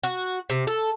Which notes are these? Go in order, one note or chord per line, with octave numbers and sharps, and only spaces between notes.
F#4
C3
A4